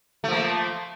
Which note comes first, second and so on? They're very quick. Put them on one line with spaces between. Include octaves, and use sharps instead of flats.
A3 F3 A#3